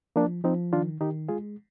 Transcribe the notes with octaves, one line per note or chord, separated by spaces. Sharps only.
F3 A#3 D4
F3 C4 D#4
D#3 D4 F4
D#3 D#4 G4
G#3 F4 G#4